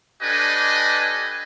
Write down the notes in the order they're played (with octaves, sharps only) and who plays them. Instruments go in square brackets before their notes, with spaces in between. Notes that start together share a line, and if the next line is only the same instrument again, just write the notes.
[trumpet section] D4 G4 A4 B4 D#5 G#5